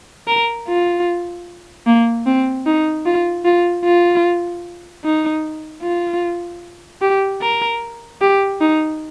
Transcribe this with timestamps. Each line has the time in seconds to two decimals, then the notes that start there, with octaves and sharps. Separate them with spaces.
0.28 A#4
0.68 F4
1.86 A#3
2.26 C4
2.66 D#4
3.06 F4
3.45 F4
3.85 F4
5.04 D#4
5.82 F4
7.02 G4
7.42 A#4
8.21 G4
8.61 D#4